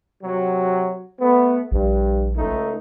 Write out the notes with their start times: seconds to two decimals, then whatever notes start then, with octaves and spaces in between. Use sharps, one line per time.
0.23 C3 F#3
1.20 A3 B3
1.71 A#1 G2
2.36 C#2 A3 D#4